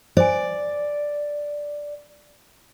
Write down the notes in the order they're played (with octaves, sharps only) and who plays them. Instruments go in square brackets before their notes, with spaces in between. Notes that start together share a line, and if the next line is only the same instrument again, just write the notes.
[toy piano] C5 G#5 [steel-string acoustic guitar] D5